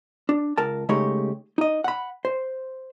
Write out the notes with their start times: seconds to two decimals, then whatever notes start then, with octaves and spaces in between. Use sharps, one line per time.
0.29 D4
0.58 C#2 A#4 A5
0.89 C#3 G#3 A3 D#4 G4 C#5
1.58 D#4 D#5
1.84 F#5 B5
2.25 C5